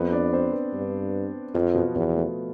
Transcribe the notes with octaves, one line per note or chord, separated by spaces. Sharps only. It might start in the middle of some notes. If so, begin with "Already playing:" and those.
Already playing: F2 B3 B4
D4 D5
C4 C5
B3 B4
G2
F2 F3 F4
B2 B3
E2 B2 B3
A3